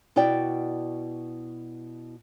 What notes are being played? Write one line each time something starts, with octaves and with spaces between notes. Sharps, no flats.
B2 E4 F#4 D5 G5